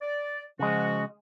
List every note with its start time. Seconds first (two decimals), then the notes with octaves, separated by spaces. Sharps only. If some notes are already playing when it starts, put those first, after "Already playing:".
0.01 D5
0.59 C#3 F3 G#3 F#4